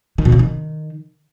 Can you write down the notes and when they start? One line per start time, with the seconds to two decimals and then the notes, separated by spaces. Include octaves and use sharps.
0.18 D#3
0.25 B2
0.32 C#3
0.39 D#3